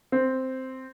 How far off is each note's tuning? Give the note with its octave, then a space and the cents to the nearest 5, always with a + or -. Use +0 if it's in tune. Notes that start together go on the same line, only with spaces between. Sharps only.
C4 -5